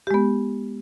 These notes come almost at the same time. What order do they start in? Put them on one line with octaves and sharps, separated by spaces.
G4 G#3 B3